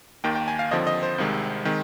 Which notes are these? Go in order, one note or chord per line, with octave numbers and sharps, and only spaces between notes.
D#2 D#3 A#3 G5
G5
G#5
F5
D#2 D3 F3 C4 D#5
D#5
C5
C2 C3 D#3 G#3 C4
D#3 G#3 C4